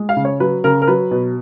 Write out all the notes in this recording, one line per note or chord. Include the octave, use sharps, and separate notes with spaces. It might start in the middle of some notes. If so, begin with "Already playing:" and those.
Already playing: G#3
F5
C#3
C#5
F#3 B4
C#3 A#4
A#4
F#3 B4
B2